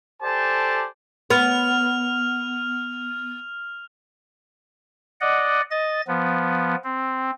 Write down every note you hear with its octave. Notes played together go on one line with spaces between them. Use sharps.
G4 A4 C5 D5 G#5 A5
B3 F6 F7
D5 D#5 F#5
D#5 A6
F3 B3
C4